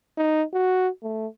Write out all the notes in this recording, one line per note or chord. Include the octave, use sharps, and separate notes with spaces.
D#4
F#4
A3